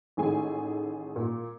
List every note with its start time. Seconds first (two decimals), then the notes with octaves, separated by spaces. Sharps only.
0.17 A1 D#3 A3 G#4 G#5
1.16 A#2